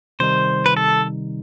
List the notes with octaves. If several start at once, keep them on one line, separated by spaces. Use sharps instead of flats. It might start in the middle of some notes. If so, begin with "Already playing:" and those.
C3 D#3 G3 D#4 C5
B4
A4